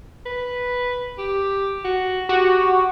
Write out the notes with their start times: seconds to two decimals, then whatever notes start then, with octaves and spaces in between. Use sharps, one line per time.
0.26 B4
1.18 G4
1.84 F#4
2.29 F#4 G4